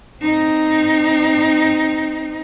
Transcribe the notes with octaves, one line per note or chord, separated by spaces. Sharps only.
C4 D#4